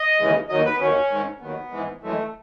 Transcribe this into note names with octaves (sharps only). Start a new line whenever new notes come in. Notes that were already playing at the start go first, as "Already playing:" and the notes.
Already playing: D#5
D#2 C#3 E3 G#3
D#2 D#3 F#3 D#5
B4
B3
D#2 D#3 F#3 C#4
G#2 D#3 G#3
D#2 D#3 F#3 B3
G#2 E3 G#3
F#2 E3 G#3 A3